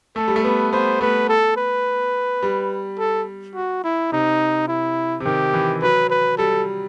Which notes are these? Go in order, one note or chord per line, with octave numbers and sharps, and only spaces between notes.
A3 A4
G3
A3
B3 B4
B3 C5
A3 B4
A4
B4
G3
A4
F#4
E4
C3 D#4
E4
C3
D#3 G4
E3
F#3 B4
B4
G3 A4